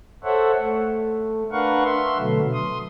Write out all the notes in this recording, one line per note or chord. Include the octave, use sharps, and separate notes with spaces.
A4 C5 C#5 E5 F#5
A3
D4 A#4 B4 F5 F#5 C#6
E5 C6
B2 D3 F#3 A3 B3
C6 D#6